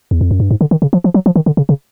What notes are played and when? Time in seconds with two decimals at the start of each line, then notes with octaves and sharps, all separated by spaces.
0.11 E2
0.21 F2
0.31 F#2
0.40 G2
0.51 G#2
0.61 D3
0.71 D#3
0.82 C#3
0.93 F3
1.04 F3
1.14 F#3
1.26 F3
1.36 D#3
1.46 D3
1.57 C#3
1.69 C#3